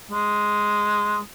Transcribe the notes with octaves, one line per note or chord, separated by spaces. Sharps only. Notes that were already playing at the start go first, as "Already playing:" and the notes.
G#3